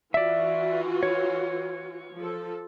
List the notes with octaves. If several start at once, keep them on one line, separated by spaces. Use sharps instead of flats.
E3 F4 F#4 D5 E5
C#5
F3 A4